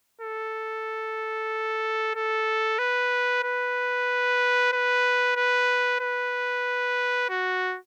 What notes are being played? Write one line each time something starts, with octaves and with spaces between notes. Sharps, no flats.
A4
A4
B4
B4
B4
B4
B4
F#4